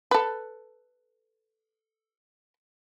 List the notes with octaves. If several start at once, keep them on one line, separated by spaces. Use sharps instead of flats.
A4 B4